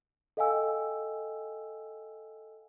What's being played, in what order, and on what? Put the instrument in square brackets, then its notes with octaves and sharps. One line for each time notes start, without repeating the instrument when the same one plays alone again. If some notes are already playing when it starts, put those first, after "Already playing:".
[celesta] A4 D#5 F5 G5 G#5 E6